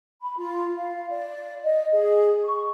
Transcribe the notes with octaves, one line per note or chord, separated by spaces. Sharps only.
B5
F4
F5
D5
D#5
G#4
C#6